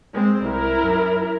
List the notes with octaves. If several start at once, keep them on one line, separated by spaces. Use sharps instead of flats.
G#3 C4
C2 E4 A#4
F#2